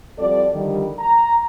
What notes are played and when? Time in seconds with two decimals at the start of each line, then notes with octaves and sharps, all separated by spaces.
0.18 F3 G3 C4 F#4 A4 D5
0.53 D3 D#3 F3 G3
0.99 A#5